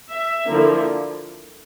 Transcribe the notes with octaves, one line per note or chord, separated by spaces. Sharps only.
E5
D3 F3 A#3 E4